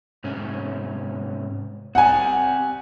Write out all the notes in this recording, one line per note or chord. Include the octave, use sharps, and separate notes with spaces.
G#2 C3 C#4
C4 G4 D5 F#5 G#5